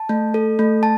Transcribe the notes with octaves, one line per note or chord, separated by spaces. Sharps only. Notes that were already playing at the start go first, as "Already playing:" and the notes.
Already playing: A5
A3
A4
A3
A5